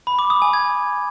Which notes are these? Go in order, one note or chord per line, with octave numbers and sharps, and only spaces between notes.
B5
D6
D#6
G#5
G#6